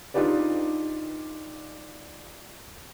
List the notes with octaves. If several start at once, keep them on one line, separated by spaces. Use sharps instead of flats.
D4 D#4 F4 G4 B4 D5